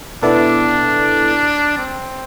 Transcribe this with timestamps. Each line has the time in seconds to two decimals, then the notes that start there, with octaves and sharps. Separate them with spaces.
0.23 B2 B3 D4 E4 A4 D5
1.78 C4